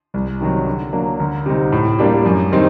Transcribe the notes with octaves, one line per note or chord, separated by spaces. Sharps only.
C2
C3 D#3 F#3
D3
F#3 A#3 D4
D2
C3 G3 C4 D#4
A2
G3 A#3 D4 G4
F#2
D#3 G3 C4 D#4